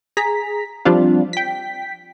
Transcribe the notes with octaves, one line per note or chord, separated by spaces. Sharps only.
G#4 A#5 B6
F3 G3 C4 D4 F4
G5 B6